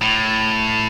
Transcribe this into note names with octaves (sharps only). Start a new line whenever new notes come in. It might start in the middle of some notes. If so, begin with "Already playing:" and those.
A2